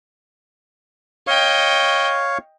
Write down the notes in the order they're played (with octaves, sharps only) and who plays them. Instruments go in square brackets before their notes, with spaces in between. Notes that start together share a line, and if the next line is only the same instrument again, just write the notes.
[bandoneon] C#5 F5 C#6 [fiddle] D#5 G5